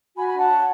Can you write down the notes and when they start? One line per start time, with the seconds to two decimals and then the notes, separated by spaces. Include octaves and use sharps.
0.16 F#4 G#5 B5
0.27 B5
0.32 D4
0.38 F#5 A5
0.49 C#5